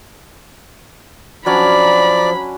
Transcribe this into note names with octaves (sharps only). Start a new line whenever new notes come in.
F3 F#3 C#4 D4 D5 B5